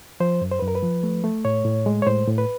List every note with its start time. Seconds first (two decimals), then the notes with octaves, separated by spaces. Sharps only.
0.20 F3 C5
0.42 F#2
0.52 C5
0.59 F#2 B4
0.68 A#4
0.75 B4
0.83 F3
1.03 A3
1.24 A3
1.45 A2 C#5
1.65 A2
1.86 G#3
2.02 C#5
2.06 A2 C5
2.28 A2
2.38 B4